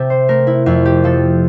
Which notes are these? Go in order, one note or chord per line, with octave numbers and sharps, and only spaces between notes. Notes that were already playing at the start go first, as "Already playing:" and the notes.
Already playing: C3 E5 G5 A5
C5
A3 A#4
E4
F2 E4
G4
F3 A4